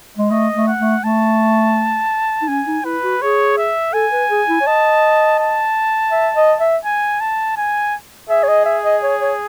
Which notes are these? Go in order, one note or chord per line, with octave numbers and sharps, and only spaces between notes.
G#3
A3 D#5
A3
F#5
A3
A3 A5
D#4
C#4 G#5
D#4
E4 B4
F#4
G#4 C#5
E5
A4 G#5
B4
G#4
E4
C#5
D#5 A5
A5
E5
D#5
E5
G#5
A5
G#5
G#4 E5
C#5
D#5
E5
D#5
C#5
C#5